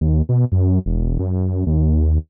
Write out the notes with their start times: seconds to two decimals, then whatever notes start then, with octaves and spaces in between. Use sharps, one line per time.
0.01 D#2
0.29 B2
0.52 F#2
0.86 E1
1.19 F#2
1.67 D#2